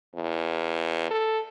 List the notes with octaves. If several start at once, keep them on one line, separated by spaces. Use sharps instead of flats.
E2
A4